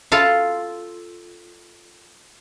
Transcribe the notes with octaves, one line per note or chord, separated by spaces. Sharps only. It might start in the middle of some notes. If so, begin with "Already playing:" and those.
F4 A4 F5